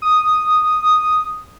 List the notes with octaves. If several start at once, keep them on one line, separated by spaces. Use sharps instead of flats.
D#6